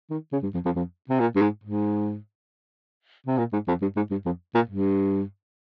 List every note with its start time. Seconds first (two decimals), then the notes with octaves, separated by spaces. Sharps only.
0.11 D#3
0.33 C#3
0.43 G2
0.54 F2
0.65 F2
0.76 F2
1.10 C3
1.20 A#2
1.36 G2
1.42 G#2
1.64 G#2
3.27 C3
3.38 A#2
3.53 G#2
3.68 F2
3.82 G2
3.96 G#2
4.11 G2
4.26 F2
4.55 A#2
4.70 G2